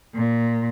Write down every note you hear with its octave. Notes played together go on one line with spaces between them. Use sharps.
A#2